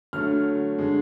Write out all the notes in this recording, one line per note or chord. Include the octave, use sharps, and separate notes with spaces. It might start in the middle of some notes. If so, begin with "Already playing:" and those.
D3 F#3 A3 F6
D3 G#3